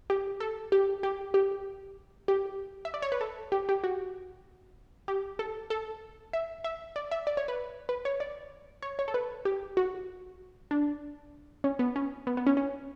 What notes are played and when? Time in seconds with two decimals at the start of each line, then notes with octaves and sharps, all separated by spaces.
0.10 G4
0.40 A4
0.72 G4
1.03 G4
1.34 G4
2.28 G4
2.85 E5
2.94 D5
3.02 C#5
3.12 B4
3.21 A4
3.52 G4
3.69 G4
3.84 F#4
5.08 G4
5.39 A4
5.70 A4
6.33 E5
6.64 E5
6.96 D5
7.11 E5
7.27 D5
7.37 C#5
7.48 B4
7.89 B4
8.05 C#5
8.20 D5
8.82 C#5
8.99 C#5
9.08 A4
9.14 B4
9.45 G4
9.77 F#4
10.71 D4
11.64 C#4
11.79 B3
11.96 C#4
12.27 B3
12.37 B3
12.47 C#4
12.57 C#4